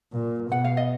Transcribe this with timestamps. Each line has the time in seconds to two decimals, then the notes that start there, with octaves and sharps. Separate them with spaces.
0.13 A#2
0.51 B2 F#5
0.64 F5
0.77 D#5